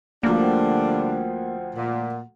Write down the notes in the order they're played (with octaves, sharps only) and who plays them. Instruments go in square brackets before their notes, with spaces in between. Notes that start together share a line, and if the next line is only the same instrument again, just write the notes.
[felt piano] D2 F3 [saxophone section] D3 G3 D4 [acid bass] A#3
[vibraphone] C5 F#5 G5
[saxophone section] A#2 [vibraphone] F#5